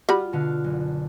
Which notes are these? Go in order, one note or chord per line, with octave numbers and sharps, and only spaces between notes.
G3 F4 F#4 B5
B2 D3 F5
F#1